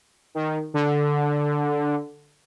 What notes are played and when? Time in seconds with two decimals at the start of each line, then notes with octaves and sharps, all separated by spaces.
0.35 D#3
0.74 D3